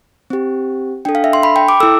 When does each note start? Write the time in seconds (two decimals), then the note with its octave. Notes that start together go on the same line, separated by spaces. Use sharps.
0.30 C4 G4
1.05 D4 A4 G5
1.15 F5
1.24 E5
1.33 C6
1.43 B5
1.56 G5
1.69 D6
1.80 E4 A4 E6